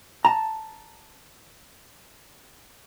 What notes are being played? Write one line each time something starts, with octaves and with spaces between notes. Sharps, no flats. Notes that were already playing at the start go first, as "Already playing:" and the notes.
A5 A#5